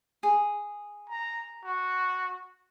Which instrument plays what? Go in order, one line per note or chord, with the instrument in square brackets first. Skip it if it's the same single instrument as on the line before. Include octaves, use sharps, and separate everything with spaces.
[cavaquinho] G#4
[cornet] A#5
F#4